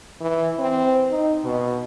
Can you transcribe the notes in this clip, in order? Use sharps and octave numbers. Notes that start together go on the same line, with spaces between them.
E3
C4
D#4
B2